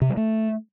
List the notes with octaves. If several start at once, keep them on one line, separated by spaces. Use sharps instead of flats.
C3
G3
A3